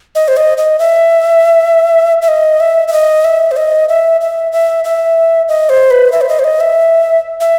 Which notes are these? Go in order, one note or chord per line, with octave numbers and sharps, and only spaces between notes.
D#5
C5
D#5
D#5
E5
E5
D#5
E5
E5
D#5
E5
C5
D#5
E5
E5
E5
E5
D#5
C5
B4
E5
C5
D#5
C5
D#5
E5
E5